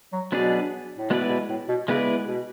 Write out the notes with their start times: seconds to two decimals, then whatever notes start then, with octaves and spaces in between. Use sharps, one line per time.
0.13 F#3
0.32 B2 F#3 B3 D4 G#4 D5
0.97 A2
1.10 B2 G#3 B3 E4 B4 D5
1.29 B2
1.49 A2
1.69 B2
1.88 C#3 G#3 B3 E4 B4 D5
2.27 B2